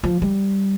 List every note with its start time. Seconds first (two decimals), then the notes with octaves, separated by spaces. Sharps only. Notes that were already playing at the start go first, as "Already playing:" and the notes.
0.04 F3
0.22 G3